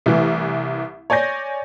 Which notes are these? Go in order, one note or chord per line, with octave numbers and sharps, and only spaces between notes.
C2 E3 A3
C#5 D5 G#5 G6 A#6